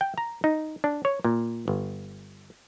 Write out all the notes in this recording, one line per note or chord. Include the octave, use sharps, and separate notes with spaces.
G5
A#5
D#4
D4
C#5
A#2
G1